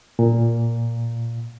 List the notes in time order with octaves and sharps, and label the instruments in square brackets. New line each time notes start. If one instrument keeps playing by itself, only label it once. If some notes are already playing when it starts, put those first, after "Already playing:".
[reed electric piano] A#2